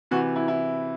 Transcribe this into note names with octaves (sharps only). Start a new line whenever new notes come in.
C3 E3 F#4
E4
E4